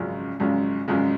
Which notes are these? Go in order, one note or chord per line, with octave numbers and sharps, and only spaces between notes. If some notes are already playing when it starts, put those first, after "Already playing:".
Already playing: G#1 F#2 C#3 F3 G#3
G#1 F#2 C#3 F3 G#3
G#1 F#2 C#3 F3 G#3